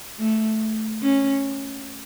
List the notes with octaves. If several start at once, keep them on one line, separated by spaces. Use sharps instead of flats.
A3
C#4